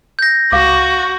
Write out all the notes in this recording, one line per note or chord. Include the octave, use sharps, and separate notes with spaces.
G6 A#6
C#2 F#4 F5 D6